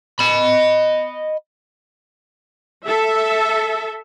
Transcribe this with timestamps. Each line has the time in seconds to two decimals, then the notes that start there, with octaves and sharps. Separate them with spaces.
0.19 D#5 B5
2.86 A4 E5